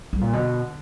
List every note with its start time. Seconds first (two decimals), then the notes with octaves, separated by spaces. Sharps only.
0.13 G3
0.21 A#2
0.33 B2 D3